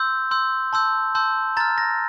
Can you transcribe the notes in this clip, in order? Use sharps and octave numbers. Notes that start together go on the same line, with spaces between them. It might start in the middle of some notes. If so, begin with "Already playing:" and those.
Already playing: C6 E6 G6
C6 E6 G6
A5 C6 E6 G6
A5 C6 E6 G6
A#5 F6 A6
A#6